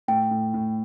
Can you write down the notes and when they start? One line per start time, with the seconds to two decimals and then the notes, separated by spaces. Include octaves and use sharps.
0.08 A2 G5
0.31 A2
0.54 A2